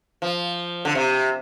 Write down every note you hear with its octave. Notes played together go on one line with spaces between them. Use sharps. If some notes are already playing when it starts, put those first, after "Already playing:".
F3
D3
C3